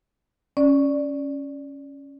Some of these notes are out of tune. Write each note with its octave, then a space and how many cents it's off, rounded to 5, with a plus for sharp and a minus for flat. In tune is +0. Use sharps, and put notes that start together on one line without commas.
C#4 +0 D5 +0